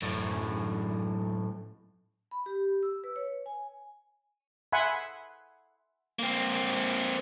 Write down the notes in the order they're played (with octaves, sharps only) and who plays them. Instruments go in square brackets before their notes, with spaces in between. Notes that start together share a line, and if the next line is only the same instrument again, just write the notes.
[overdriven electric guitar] F#2 A2
[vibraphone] B5
G4
E6
B4
C#5
G#5
[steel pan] E5 F#5 G#5 B5 C6
[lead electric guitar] A#3 C4